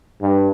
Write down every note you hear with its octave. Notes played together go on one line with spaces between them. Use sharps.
G2